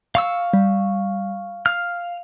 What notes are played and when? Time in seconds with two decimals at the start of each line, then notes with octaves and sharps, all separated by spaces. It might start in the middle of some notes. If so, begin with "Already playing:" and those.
0.15 F5 C#6 E6
0.53 G3
1.66 F5 F6